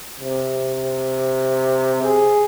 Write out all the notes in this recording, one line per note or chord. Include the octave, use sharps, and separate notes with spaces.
C3
G#4